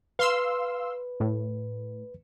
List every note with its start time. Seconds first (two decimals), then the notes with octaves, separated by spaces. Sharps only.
0.19 B4 F5 C6 E6
1.20 A2